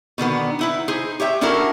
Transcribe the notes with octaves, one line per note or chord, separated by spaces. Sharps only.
B2 D3 D#3 B3
D#4 E4 B4
D#4 G#4 C5
G4 C#5 E5 G5
C#4 D4 E4 F#4 A4 A#4